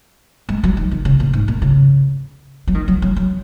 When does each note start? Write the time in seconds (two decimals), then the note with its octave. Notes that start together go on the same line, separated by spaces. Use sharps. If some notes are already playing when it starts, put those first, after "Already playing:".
0.49 G#3
0.63 F#3
0.77 D#3
0.91 D#3
1.05 C#3
1.20 A#2
1.33 G#2
1.48 A#2
1.62 C#3
2.67 F#3
2.74 D#3
2.88 F#3
3.02 F#3
3.16 F#3